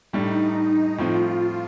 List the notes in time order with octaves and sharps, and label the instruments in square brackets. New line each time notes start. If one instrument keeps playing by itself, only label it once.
[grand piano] A2 G3 D4 [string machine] D#4
[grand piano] A2 F3 C4 [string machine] F4